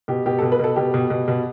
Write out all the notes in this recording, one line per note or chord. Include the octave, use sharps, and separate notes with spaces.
B2 G4
B2 G4
B2 A4
B4
B2 A4
B2 G4
B2
B2
B2